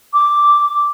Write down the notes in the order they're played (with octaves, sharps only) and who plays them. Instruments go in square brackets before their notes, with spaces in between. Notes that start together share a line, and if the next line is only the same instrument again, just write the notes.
[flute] D6